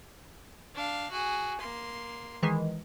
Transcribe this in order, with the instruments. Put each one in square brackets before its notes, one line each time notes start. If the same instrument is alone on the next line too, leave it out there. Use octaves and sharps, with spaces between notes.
[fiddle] D4 F5
F#4 G#4
A#3 C6
[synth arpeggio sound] D#3 E3 G#3